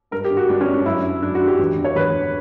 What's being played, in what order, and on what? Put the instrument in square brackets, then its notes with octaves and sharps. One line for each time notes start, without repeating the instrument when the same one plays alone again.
[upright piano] G2 A#4
G4
D3
F#4
G2 D4
C#4
D3
D4
F#2 E4
D3
F#2 D4
F#4
D3
G4
E2
D3
C#5
E2 B4
D3